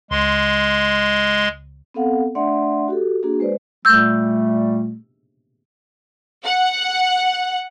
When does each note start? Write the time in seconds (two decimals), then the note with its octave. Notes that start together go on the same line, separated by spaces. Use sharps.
0.11 C#2 G#3 C6
1.94 B3 C4 A4 F5 F#5
2.35 A3 D4 D5 E5 F#5 C6
2.88 F#4 G4 A4
3.23 A#3 D4 F#4 G#4
3.40 G#3 B4 C5 D5
3.85 A#2 G3 A3 E6 G6
6.44 F#5